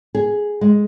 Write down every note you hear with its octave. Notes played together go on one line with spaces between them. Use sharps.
G#4
G#3